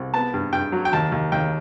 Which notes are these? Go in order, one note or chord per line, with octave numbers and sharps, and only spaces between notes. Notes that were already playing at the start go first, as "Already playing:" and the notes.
Already playing: C2
B3 A5
G2
G2 G5
F#3
G5
D#2 A5
D#2
D#2 G5